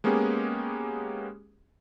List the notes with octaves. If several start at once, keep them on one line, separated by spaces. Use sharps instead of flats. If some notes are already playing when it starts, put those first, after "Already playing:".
G#3 A#3 B3 C#4 G4 G#4